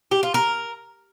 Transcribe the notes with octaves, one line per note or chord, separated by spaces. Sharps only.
G4
F4
A#4